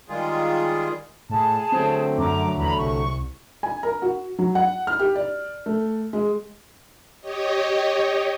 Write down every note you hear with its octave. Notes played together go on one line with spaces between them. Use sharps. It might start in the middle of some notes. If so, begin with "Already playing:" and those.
D#3 G3 G#3 F4 G#4
A2 G#4 A5
D3 F#3 A3 C4
F#2 A#5 D6
E2 A#5 B5
C2 C#6
G#5
A#4
F#4
F#3
F#5
F6
G4
D5
A3
G#3
G4 C#5 D#5